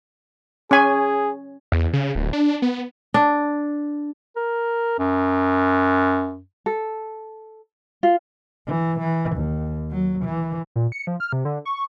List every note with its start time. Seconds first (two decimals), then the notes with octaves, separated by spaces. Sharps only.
0.71 C#4 G#4 G#5
1.72 E2
1.93 C#3
2.15 D1
2.33 D4
2.62 B3
3.14 D4
4.36 A#4
4.99 F#2
6.66 A4
8.03 F4
8.67 E3
9.00 E3
9.36 D#2
9.91 F#3
10.25 E3
10.76 A#2
10.92 C#7
11.07 F3
11.20 F6
11.33 C3
11.45 D3
11.65 C#6